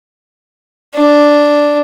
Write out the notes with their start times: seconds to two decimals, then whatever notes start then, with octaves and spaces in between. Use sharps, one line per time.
0.95 D4